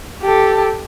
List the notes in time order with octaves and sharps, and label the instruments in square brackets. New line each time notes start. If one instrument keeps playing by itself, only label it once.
[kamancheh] G4 A4